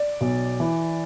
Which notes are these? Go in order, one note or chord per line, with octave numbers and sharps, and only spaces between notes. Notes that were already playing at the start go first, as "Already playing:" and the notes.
Already playing: D5
B1
E3